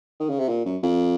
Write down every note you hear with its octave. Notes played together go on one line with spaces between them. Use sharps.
D#3
C#3
C3
A#2
F#2
F2